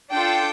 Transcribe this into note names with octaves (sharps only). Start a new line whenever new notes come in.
D4 F4 A4 G5